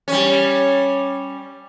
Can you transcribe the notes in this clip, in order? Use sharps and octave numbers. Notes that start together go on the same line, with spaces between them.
G3 C#4